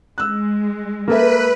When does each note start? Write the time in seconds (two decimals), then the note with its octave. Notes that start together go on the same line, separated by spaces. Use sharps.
0.18 G#3 E6 F#6
1.08 A#3 A4 B4 E5